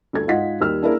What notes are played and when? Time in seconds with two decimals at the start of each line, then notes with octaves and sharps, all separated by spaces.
0.13 D2 G2 A4 G#6
0.28 G#2 F4 D#5 F#5 B6
0.60 D#2 G3 E6 F6
0.82 A#3 D4 E4 G#4 A#4